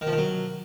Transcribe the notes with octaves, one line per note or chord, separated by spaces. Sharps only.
D#3
F3
D#3
F#3